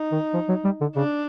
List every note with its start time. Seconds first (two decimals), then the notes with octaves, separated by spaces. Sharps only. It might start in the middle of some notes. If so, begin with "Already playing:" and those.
Already playing: D#4
0.12 D#3
0.33 F3
0.49 F#3
0.64 G3
0.81 D3
0.96 C#3 D4